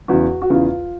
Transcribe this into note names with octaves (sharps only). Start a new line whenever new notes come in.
E2 C#3 E3 F#4
F#4
E2 C#3 E3 F4